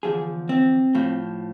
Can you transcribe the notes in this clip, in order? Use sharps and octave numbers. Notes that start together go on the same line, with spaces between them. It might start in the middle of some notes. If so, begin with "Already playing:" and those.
E2 D3 F3 G#4
C4
A2 F3